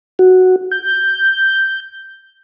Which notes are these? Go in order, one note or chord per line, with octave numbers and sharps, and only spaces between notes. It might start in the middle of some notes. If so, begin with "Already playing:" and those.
F#4
G6